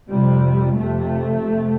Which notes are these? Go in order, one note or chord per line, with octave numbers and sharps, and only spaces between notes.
F2 C3 G3
F2 C3 A3
F2 C3